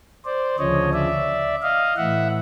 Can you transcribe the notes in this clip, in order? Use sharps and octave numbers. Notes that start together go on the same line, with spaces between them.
C5 D5
D2 C#3 F3 C#5 D#5
D5 E5
D#5 F5
A2 E3 E5 F#5